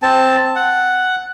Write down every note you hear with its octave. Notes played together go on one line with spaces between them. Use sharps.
C4 A5
F#5